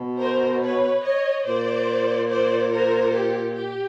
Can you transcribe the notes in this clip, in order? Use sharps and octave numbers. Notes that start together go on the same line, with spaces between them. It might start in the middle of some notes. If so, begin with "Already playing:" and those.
Already playing: B2
A#4 C5
B4 C#5
C#5 D#5
A#2 C5 D5
C5 D5
A#4 C5
G4
G4